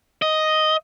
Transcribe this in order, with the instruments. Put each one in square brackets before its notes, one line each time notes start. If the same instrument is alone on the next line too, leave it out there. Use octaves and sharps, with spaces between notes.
[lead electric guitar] D#5